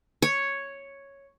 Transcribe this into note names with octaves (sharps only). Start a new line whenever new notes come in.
C#5